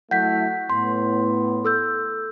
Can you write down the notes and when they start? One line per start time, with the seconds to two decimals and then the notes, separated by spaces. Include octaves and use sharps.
0.11 F#3 A3 E4 F#5 G6 B6
0.70 A2 B3 C6
1.65 A4 E6 G6